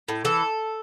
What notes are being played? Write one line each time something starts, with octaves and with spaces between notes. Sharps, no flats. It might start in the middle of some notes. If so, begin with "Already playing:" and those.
A2
E3 A4